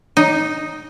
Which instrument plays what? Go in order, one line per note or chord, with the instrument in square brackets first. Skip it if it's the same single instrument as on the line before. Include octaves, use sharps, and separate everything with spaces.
[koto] D#4